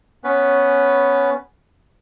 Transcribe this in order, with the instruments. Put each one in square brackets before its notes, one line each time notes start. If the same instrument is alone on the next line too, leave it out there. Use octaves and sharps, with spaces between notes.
[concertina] B3 C#4 B4